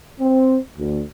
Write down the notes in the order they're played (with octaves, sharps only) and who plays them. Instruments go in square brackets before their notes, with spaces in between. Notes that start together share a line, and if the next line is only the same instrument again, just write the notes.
[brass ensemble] C4
D2